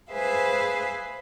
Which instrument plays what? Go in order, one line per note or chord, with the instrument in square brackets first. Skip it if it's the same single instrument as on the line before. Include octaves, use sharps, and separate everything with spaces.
[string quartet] G#4 B4 C5 E5 F5 G#5